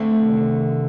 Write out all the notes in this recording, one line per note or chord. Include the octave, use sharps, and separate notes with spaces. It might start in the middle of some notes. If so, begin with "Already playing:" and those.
Already playing: D2 D3 A3 C4
C3 D#3